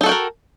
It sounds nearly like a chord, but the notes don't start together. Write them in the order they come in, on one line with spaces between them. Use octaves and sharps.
D#4 A4 F#4 G5 A#4